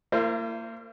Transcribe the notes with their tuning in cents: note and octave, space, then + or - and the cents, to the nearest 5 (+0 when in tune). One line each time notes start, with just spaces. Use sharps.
A#3 -30 E4 +45 C5 +0